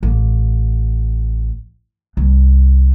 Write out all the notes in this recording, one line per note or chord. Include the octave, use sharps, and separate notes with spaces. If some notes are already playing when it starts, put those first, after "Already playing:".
A1
C2